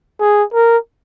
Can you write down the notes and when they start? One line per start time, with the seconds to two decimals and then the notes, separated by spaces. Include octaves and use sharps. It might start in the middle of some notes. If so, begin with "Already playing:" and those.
0.20 G#4
0.53 A#4